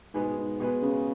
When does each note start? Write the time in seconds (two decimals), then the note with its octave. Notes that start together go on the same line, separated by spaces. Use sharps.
0.14 G#2 B2 G#3 B3 G#4 B4
0.37 G#2
0.60 B2 G#3 B3 G#4 B4
0.82 C#3